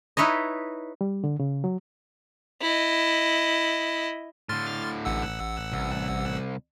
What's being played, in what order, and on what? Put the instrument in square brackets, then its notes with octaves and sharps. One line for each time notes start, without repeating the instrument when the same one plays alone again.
[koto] D#4 E4 B4 C#5 D#5
[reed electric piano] G3
D3
C#3
F#3
[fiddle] E4 D#5
[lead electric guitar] A2 D3 [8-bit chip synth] C6 F6 A6
[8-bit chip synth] A1 F#5 E6
[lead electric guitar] C2